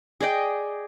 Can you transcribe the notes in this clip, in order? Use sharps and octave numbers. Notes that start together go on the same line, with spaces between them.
G#4 D5 D#5 G5